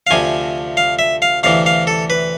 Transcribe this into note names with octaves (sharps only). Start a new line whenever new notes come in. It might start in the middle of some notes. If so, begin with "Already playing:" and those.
F5
D2 C3 F3 G#5
F5
E5
F5
D2 C3 E3 F5
F5
A4
B4